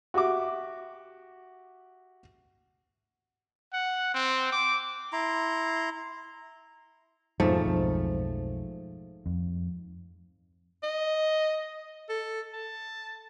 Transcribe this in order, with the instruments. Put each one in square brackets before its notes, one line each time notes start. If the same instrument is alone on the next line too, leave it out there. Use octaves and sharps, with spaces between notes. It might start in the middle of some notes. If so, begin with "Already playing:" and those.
[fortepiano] F#4 G4 E5 D6
[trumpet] F#5
C4
D6
[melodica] E4 A#5 C6
[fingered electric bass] F2 B2 [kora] G#2 F3 A3
[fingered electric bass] B1 F2
F2
[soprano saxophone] D#5
A4
A5